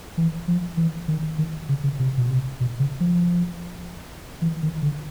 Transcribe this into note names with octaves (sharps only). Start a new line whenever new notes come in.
E3
F3
E3
D#3
D#3
C#3
C#3
C3
B2
C3
B2
C#3
F3
E3
D#3
D3